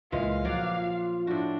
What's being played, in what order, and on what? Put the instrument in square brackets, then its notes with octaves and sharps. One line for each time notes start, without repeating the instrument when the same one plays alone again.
[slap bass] C#2 [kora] A#2 E3 G#3 [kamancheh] F5
[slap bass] F3 [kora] F#3 D5 [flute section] D6 F#6
[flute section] F4
[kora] A2 F#4 [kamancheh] D4